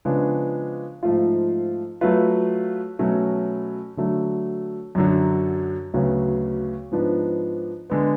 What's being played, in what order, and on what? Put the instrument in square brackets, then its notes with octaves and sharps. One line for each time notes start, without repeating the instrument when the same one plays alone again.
[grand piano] C#3 F3 G#3 B3 D4
G#2 F3 A3 F4
F#3 A3 F4 B4
B2 F#3 A3 C#4
D3 F#3 A3
F#2 D3 F#3
D2 C#3 F#3 B3
G#2 F3 B3 D4
D3 G#3 B3